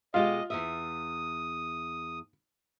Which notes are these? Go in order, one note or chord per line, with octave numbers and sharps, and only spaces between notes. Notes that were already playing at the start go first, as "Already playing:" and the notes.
B2 G#3 F4 G4 D#5
E2 C#3 E5 D#6